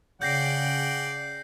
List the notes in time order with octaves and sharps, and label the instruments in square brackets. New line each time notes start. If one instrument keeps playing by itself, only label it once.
[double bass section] C#3 [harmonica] D5 F#5 G5 [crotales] G6 A#6 C7